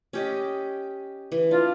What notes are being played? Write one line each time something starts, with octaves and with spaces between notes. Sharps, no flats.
C#4 G4 D#5
E3
D4 F4